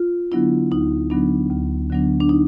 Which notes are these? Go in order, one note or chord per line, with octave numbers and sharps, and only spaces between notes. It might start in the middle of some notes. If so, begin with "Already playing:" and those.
Already playing: F4
D3 F#3 B3 D4 E4
D2 D#4
D3 F#3 B3 D4
D2
D3 F#3 B3 D4
D4
D#4